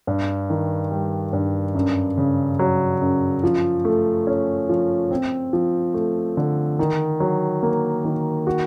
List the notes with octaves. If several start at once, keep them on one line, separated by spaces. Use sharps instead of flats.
G2
D#3
G3
G2
F#2
C#3
F#3
F#2
F3
A3
C#4
F3
C4
F3
A3
D3
D#3
F#3
A#3
D#3
F#4